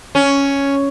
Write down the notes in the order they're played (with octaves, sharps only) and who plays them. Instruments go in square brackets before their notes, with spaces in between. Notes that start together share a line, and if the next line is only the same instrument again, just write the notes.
[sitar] C#4